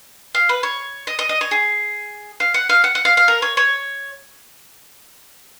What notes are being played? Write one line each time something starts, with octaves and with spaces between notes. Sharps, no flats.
F5
B4
C#5
D#5
D#5
D#5
C#5
G#4
F5
F#5
F5
F#5
F#5
F5
F5
A#4
C#5
C#5